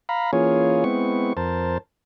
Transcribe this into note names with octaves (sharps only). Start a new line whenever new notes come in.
F5 A#5 B5
E3 A#3 C#4 F4 G#4 C#5
G#3 B3 C4 E4 C#6
F2 A#4 C5 A5